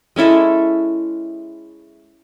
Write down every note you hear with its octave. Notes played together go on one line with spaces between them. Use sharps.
G#3 C#4 E4 A4